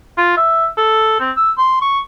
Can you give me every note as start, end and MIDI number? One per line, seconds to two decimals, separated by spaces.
0.18 0.36 65
0.37 0.67 76
0.77 1.19 69
1.20 1.31 60
1.37 1.52 88
1.58 1.77 84
1.81 1.99 85